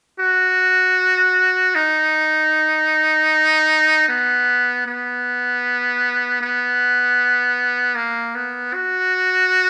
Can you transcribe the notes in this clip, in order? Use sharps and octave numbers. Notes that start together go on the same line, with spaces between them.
F#4
D#4
B3
B3
B3
A#3
B3
F#4